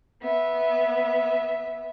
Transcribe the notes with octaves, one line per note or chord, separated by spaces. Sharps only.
B3 E5